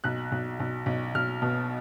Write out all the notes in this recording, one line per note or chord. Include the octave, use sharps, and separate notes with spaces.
B1 F#6
B1
B1
B1
B1 F6
B2